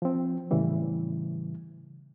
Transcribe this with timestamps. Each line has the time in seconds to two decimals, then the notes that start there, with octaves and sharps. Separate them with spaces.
0.02 F3 C4
0.51 A2 C#3 E3 G3